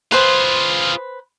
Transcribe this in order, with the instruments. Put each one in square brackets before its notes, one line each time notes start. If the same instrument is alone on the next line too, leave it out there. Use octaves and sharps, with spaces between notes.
[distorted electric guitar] F4 G#4 [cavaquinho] B4 C5